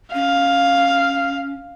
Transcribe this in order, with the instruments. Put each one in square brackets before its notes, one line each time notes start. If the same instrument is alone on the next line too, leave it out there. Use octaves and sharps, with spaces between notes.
[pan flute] C#4 [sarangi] F5